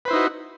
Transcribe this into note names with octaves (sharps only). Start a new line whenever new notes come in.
D#4 E4 F#4 B4 C5